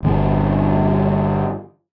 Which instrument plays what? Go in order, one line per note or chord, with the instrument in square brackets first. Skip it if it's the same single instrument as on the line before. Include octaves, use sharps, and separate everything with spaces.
[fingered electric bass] G1 E3 B3